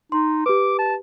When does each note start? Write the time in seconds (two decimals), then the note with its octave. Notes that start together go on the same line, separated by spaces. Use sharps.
0.12 D#4 C6
0.46 G4 B4 D6
0.79 A5